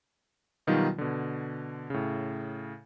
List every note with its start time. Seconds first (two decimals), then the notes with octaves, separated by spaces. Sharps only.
0.67 B2 D#3 F#3 G3 D#4 F4
0.98 B2 D3
1.90 A2 C#3